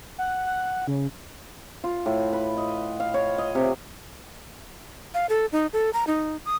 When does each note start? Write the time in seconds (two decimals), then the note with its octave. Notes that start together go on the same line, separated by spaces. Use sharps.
0.18 F#5
0.46 F#5
0.87 C#3
1.84 F4
2.06 A2
2.33 B4
2.57 D#5
3.00 F5
3.14 C#5
3.38 D#5
3.55 C3
5.14 F5
5.29 A4
5.52 D#4
5.73 A4
5.93 A#5
6.07 D#4
6.45 D#6